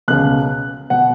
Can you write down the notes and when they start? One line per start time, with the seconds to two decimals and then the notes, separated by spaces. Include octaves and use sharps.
0.08 C#2 B2 F#6
0.90 B2 F#5